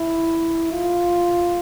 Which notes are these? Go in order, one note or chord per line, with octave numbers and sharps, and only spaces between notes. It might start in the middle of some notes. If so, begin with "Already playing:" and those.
Already playing: E4
F4